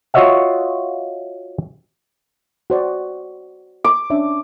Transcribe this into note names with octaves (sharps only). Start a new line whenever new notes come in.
F4 F#4 C#5 D#5 E5 F#5
F#4 C5 D5
D6
C#4 D4 E5